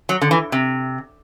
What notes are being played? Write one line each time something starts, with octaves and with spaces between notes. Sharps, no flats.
F#3
D3
E3
C3